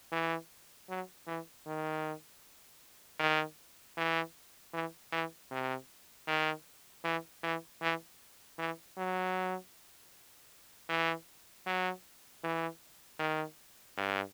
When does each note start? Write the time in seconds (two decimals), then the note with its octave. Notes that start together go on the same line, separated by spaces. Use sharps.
0.12 E3
0.89 F#3
1.27 E3
1.66 D#3
3.19 D#3
3.97 E3
4.73 E3
5.12 E3
5.51 C3
6.27 D#3
7.04 E3
7.43 E3
7.82 E3
8.59 E3
8.97 F#3
10.89 E3
11.67 F#3
12.44 E3
13.19 D#3
13.97 G2